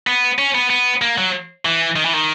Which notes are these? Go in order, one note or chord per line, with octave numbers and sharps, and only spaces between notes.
B3
C#4
B3
B3
A#3
F#3
E3
D#3
E3
D#3